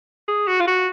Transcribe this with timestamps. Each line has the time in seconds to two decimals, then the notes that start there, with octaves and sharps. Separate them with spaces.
0.28 G#4
0.48 F#4
0.60 F4
0.67 F#4